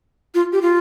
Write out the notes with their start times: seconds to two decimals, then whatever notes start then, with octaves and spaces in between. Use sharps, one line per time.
0.34 F4
0.52 G4
0.62 F4